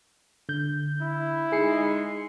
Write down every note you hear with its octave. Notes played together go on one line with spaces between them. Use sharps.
D3 G6
E4
G#3 D#4 G#4 C7 C#7